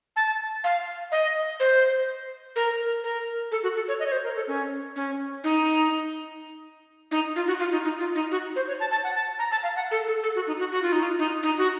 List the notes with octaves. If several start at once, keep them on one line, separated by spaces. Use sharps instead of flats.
A5
F5
D#5
C5
A#4
A#4
A4
F#4
A4
C#5
D#5
C#5
C5
A#4
A4
C#4
C#4
D#4
D#4
F4
F#4
F4
D#4
D#4
F4
D#4
F#4
C5
C#5
A5
A5
F#5
A5
A#5
A5
F5
F#5
A4
A4
A4
F#4
D#4
F#4
F#4
F4
D#4
F4
D#4
D#4
F#4